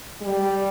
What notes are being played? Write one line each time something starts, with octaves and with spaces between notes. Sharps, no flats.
G3